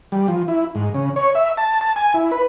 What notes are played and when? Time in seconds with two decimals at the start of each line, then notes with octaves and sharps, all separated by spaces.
0.12 G3
0.28 F3
0.48 E4
0.75 G#2
0.94 C#3
1.16 C#5
1.35 E5
1.57 A5
1.81 A5
1.96 G#5
2.14 E4
2.31 B4